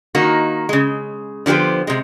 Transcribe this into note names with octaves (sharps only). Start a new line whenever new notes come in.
D#3 A#3 D#4 F#4
C#3 G#3
D3 F3 B3 G4 C5
C3 G#3